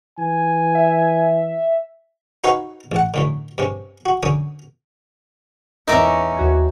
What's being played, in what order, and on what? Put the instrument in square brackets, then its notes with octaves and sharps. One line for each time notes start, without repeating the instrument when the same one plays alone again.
[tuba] E3 [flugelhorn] G#5
[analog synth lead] E5
[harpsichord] D#4 F#4 B4 C#5 F5 G#5
A1 F#5
F#2 A2 D3
G2 C3 C#4
F#4
F#2 D3 C#4 D#6
[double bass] E2 C#4 [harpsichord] D#4 [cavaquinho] A#4 E5 D6
[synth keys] D#2 F#4 G#6